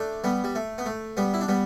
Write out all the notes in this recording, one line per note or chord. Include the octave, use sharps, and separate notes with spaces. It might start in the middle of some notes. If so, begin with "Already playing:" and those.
Already playing: A3 D4
G3 B3
G3
A3
B3
A3
G3 B3
E4
D4
G3 B3